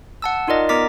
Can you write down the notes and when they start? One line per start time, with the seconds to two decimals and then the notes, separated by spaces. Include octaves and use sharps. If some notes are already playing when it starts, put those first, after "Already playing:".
0.22 F#5 A5 E6
0.48 D#4 F4 A#4 D5 D#5
0.69 B3 A#4 A#5 D6 A6 B6